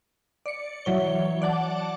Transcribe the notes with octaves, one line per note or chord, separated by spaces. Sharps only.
D5 C#7
E3 F#3 C#5 G7
D5 F#5 A5 D6